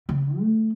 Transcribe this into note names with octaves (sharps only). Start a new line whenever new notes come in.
C#3
A3